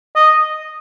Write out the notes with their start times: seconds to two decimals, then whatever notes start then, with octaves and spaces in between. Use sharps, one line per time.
0.16 D#5